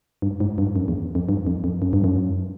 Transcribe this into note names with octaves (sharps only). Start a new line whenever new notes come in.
G2
G#2
G2
F#2
E2
F2
G2
F2
F2
F#2
G2
F#2